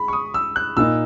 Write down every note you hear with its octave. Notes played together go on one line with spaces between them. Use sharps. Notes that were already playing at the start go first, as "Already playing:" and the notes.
Already playing: G#3 B5
C#6
D#6
E6
F#6
A#2 A#3 D#4 E6